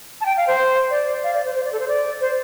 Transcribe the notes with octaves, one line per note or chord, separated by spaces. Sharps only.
A5
G5
F5
C5
D5
F5
D5
C5
C5
D5
A4
C5
D5
C5